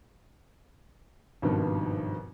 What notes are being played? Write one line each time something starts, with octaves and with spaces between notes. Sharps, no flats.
G#1 G2 B2 D#3 F3